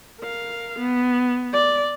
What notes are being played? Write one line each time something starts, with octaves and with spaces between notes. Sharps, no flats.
A#4 F5
B3
D5